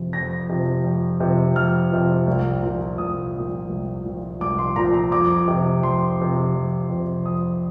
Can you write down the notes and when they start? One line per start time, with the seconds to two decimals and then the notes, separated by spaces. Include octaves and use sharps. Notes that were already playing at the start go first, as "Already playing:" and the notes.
Already playing: F2 C3 F3
0.13 F2 A#6
0.49 C3 F3
0.84 F2
1.20 C3 F3
1.56 F2 F6
1.91 C3 F3
2.27 C2
2.63 A#2 F3
2.98 C2 D#6
3.34 A#2 F3
3.69 C2
4.05 A#2 F3
4.41 C2 D6
4.59 C6
4.76 A#2 F3 A#5
4.94 A#5
5.11 F2 D6
5.48 C3 F3
5.83 F2 C6
6.19 C3 F3
6.54 F2
6.89 C3 F3
7.25 F2 D#6